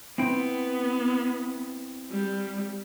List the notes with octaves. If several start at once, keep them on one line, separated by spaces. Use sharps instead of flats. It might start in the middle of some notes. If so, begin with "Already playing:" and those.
B3 C4 E4 G5
G3